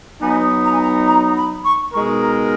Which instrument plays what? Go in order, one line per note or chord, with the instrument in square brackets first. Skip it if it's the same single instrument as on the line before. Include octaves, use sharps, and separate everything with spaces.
[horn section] F#3 B3 D#4 [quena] G#5
[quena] A#5
G#5
A#5
A#5
B5
C#6
[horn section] B2 G#3 D#4 A#4 [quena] C#6
[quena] A#5